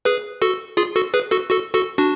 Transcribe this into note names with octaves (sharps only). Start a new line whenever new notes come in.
G#4 B4
F#4 A4
F4 G#4
F#4 A4
G#4 B4
F#4 A4
F#4 A4
F#4 A4
D4 F#4